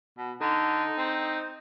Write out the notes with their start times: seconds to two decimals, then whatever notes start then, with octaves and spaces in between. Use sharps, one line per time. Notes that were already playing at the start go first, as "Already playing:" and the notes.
0.18 B2
0.41 D3 D#4
0.98 C4